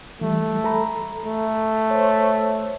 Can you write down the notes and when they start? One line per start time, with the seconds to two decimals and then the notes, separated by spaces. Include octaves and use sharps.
0.21 E3 G3 A3
0.64 A4 A#5 B5
1.26 A3
1.91 C5 C#5